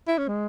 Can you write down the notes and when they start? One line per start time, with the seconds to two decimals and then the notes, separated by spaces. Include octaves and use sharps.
0.07 E4
0.18 C#4
0.28 G#3